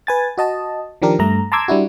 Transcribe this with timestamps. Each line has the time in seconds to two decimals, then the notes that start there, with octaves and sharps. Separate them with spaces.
0.07 B4 G#5 A6
0.38 F#4 D#5 A5
1.02 D#3 F3 D4 G4 A#4
1.19 G2 A3 A#5
1.52 A5 A#5 C6 D6 E6 G#6
1.68 G3 D4 E4 F#4